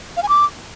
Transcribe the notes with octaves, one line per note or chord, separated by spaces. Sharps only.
F5
G#5
D6